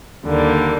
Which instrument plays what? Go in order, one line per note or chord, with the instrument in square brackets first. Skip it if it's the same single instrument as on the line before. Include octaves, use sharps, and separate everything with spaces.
[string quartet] D#2 D3 G3 A#3